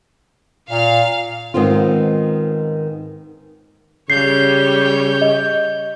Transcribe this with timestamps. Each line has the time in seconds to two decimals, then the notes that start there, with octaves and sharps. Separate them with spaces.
0.71 A#2 F5
1.54 G#2 D#3 B3 C4 F4
4.10 C#3 G3 C#5 G6 C7
5.22 D#5